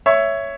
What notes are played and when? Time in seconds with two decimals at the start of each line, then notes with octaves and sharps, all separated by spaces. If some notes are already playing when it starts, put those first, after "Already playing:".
0.06 C#5 E5